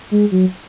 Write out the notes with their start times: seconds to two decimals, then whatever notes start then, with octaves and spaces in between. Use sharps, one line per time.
0.11 G#3
0.31 F#3